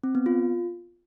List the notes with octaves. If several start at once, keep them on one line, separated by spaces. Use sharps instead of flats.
C4
B3
F4